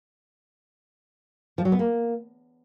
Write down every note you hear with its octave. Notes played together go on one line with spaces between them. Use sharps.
F3
F#3
B3
A#3